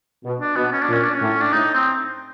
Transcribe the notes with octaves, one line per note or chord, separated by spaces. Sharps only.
B2
D4
B2 B3
C#4
D4
A#2
C#4
D4
C#4
A2
D4
A2 D#4
C4